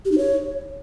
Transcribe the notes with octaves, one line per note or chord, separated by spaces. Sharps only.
G4
D#4
C#5